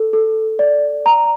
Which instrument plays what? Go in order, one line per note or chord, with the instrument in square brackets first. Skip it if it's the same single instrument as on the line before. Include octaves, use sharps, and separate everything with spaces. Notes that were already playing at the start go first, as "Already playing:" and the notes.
Already playing: [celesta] A4
A4
D5
A#5